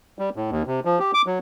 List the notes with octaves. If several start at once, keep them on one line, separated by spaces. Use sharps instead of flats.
G3
A2
D#2
C3
F3
G4
D6
F#3